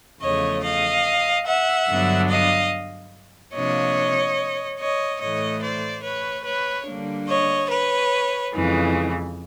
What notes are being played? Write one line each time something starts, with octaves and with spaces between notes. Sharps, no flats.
E2 C#3 F3 A3 C#5 D#5
D#5 F5
E5 F#5
G2 D3 F#3 B3 D4
D#5 F5
C3 F3 A#3 D4 C#5 D#5
C#5 D#5
A2 E3 A3 C#5 D#5
C5 D5
B4 C#5
B4 C#5
D3 G3 A#3 D4
C#5 D#5
B4 C#5
F2 C#3 E3 G#3